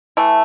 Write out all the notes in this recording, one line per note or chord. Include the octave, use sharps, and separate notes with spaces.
E3 A3